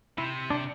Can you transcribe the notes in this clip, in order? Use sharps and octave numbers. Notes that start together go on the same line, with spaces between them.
C3 E4
D4